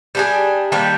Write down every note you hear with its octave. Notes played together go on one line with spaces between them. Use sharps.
G3 D4 G#4
D#3 G3 A#3 D4